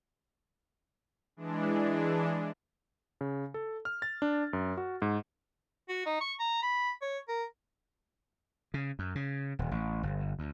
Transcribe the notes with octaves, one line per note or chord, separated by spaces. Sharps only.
E3 G#3 D4
C#3
A4
F6
A6
D4
F#2
F#4
G#2
F#4
D#4
C#6
A#5
B5
C#5
A#4
C#3
F#2
C#3
D#1
A1
G1
D2